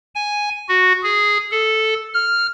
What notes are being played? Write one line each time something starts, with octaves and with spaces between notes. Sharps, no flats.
G#5
F#4
G#4
A4
F6